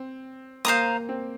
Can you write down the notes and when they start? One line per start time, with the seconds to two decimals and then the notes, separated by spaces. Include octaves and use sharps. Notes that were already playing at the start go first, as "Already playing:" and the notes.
Already playing: C4
0.65 A#3 C5 F5 A#5 D#6
1.09 C4